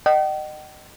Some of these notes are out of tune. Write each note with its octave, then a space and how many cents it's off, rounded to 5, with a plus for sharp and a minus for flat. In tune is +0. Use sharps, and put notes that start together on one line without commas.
D#5 -30 G5 -45